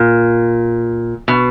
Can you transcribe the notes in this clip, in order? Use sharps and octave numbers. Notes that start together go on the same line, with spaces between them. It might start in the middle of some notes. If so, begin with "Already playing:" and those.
Already playing: A#2
B2